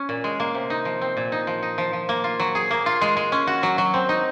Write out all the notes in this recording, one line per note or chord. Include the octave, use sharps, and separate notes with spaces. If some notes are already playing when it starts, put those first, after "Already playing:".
Already playing: C#4
A#2
G#3
A#3
C3
D#4
F3
C4
A#2
D#4
F3
D#4
F3
F3
A#3
F4
F#3
G#4
A#3
F4
G#3
G#3
C#4
F#4
F#3
F#3
C4
D#4